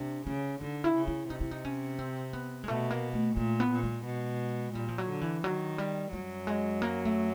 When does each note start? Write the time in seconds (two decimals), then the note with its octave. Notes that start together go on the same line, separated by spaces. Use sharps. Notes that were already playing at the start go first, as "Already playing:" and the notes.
Already playing: C3 D4
0.27 C#3 C#4
0.61 D3 D#4
0.84 E4
0.95 C#3
1.08 E4
1.30 C3 D#4
1.41 E4
1.51 D#4
1.65 C#4
1.99 C4
2.33 B3
2.64 G#3
2.68 B2 A3
2.91 A#3
3.14 A3
3.37 A#2 A3
3.60 B3
3.72 A#2
3.83 G#3
4.06 B2
4.75 A#2 G3
4.89 F3
4.98 F#3
5.09 D3
5.21 E3
5.44 D#3 F#3
5.78 G3
6.13 F#2 F#3 G3
6.47 G#3
6.82 A#3
7.05 A3